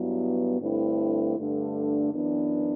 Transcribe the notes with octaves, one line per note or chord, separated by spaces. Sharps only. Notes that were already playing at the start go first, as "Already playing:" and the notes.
Already playing: G2 F#3 B3 E4
G2 D3 A3 C4 E4
G2 D3 A3 D4
F#2 E3 B3 D4